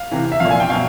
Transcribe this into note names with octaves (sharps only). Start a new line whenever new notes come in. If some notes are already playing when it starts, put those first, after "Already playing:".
Already playing: F5
C3 E3
E5
A#2 F3 F5
G#5
G5
B2 F#3 F5